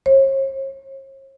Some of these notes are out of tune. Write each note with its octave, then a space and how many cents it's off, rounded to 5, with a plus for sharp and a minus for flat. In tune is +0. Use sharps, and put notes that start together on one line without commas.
C#5 -45